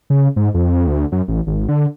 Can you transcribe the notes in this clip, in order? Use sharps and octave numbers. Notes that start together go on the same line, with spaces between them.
C#3
G#2
F2
D2
F#2
A1
G#1
D3